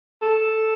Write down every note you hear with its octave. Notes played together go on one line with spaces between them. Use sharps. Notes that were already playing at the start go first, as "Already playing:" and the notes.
A4